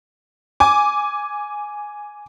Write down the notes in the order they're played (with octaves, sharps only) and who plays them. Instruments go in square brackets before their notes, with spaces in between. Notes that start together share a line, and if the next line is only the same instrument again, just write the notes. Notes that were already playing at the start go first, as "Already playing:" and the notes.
[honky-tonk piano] G#5 D6